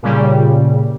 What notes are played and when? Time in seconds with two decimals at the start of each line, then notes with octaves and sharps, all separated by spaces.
0.03 A#2 C#3 G3